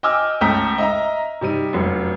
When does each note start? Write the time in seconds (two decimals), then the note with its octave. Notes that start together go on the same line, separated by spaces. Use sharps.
0.03 D#5 G5 G#5 D6 E6 F6
0.41 C#2 A3 G5 A#5 D#6 B6
0.78 D#5 E5 A#5
1.41 C3 G3 D#4 D#7
1.73 F1 F#2